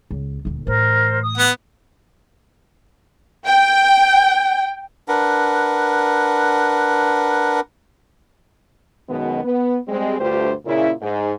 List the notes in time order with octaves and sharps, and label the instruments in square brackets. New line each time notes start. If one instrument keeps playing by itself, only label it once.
[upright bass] C#2
D#1 D2
[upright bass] A2 E3 [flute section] A#4 C5
[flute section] D#6
[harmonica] B3 F#5
[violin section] G5
[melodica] D4 A#4 B4 F#5
[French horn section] F#2 B2 D#3 G#3 B3
B3
G3 G#3 C4
D2 G2 A3 F4 G4 C5
A#2 C#3 E4
G#2